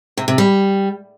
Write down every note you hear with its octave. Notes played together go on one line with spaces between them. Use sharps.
C3
C3
G3